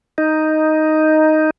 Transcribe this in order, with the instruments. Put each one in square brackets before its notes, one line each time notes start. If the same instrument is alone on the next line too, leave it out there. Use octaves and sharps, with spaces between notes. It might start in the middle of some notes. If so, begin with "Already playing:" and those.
[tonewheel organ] D#4